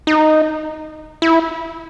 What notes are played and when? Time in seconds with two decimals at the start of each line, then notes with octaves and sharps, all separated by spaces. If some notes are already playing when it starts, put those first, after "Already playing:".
0.07 D#4
1.22 E4